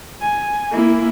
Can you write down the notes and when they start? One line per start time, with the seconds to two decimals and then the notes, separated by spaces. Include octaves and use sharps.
0.21 G#5
0.72 A#3 E4